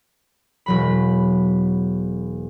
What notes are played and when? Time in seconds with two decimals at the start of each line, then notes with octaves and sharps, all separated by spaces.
0.66 E1 F#3 B5